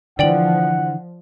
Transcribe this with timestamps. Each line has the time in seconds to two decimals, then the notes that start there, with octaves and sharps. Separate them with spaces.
0.19 D3 E3 F3 D5 F#5 G5 F#7